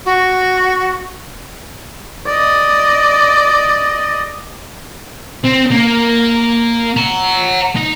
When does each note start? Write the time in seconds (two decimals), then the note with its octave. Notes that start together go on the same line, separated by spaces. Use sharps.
0.05 F#4
2.26 D5 D#5
5.45 C4
5.71 A#3
6.97 F#5 A#5
7.75 D#4